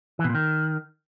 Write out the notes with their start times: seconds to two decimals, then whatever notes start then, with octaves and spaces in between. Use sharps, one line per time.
0.19 E3
0.24 B2
0.29 A#2
0.35 D#3